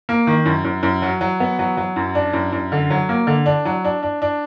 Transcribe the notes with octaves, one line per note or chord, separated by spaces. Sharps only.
A#3
D#3
F#2
F#2
F#2
F#3
F#3
B3
F#3
F#3
F#2
D4
F#2
F#2
D3
F#3
A#3
D3
D4
F#3
D4
D4
D4